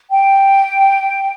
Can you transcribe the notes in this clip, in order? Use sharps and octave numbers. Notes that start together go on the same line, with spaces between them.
G5